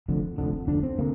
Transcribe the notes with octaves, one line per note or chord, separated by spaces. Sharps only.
F1 F2 D3
F1 F2 D3
F1 F2 D3 D4
C4
D3 A#3